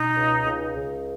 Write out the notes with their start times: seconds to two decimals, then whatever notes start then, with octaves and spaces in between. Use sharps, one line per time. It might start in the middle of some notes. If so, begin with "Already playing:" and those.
Already playing: B2 D#4
0.15 C#2
0.46 C#2
0.76 C#2